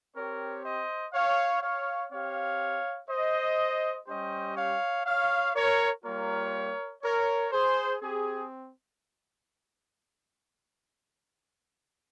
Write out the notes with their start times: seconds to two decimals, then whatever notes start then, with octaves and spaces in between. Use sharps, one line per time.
0.15 C4 G4 A#4 C#5
0.63 C5 D#5
1.13 C#5 F5
1.61 C#5 F5
2.11 C4 G4 C#5 F5
3.09 C5 D#5
4.07 G3 C#4 G4 C5 D#5
4.56 C#5 F5
5.05 C#5 F5
5.54 A#4 C#5
6.04 G3 A#3 F4 A#4 C#5
7.03 A#4 C#5
7.51 G#4 C5
8.01 C4 G4 G#4